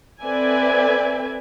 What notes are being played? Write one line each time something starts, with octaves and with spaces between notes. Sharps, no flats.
C4 A4 B4 D5 E5 G#5